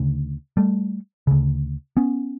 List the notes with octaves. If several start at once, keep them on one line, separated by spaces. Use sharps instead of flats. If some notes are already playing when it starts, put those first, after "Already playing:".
Already playing: D2 C#3
G3 A3
D2 C#3
B3 C#4